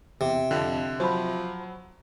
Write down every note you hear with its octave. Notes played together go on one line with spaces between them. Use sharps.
E2 C3
F2 D3
F3 F#3 C5 B5